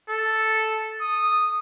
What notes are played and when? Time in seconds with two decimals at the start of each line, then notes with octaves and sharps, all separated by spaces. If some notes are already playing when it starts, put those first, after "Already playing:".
0.10 A4
1.01 D#6